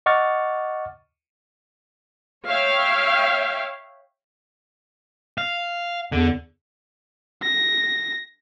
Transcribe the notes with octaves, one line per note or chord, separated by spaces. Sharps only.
D#5 F#5 C#6 D6 F6 A6
C#5 E5 F5 G5
F5
E2 D3
A#6